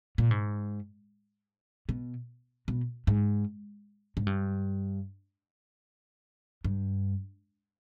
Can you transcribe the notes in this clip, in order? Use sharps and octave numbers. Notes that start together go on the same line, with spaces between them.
A#2
G#2
B2
B2
G#2
G#2
G2
G2